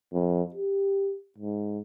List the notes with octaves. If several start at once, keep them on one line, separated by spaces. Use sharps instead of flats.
F2
G4
G#2